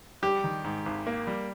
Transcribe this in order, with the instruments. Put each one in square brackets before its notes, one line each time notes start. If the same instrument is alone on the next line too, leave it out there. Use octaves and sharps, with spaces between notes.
[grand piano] G3 [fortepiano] G4
[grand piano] D#3
G#2
G#1
A#3
G3